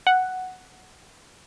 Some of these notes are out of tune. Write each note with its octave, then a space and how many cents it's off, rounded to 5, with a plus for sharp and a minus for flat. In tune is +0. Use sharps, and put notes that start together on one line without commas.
F#5 +5